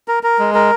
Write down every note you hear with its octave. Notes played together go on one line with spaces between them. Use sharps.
A#4
A#4
G#3
A#4